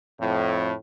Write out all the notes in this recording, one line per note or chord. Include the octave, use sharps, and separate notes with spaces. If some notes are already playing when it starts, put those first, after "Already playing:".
F2 A2